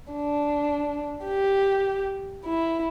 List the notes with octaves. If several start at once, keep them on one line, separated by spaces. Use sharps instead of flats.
D4
G4
E4